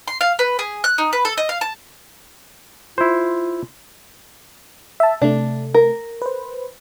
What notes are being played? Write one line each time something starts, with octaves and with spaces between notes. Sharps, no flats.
C6
F5
B4
G#4
F#6
D#4
B4
A4
D#5
F5
A5
E4 F4 C5
E5 A5
C3 A3 D4
A#4
B4 C5